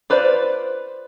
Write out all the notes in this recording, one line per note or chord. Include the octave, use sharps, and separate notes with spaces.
F4 B4 C5 D5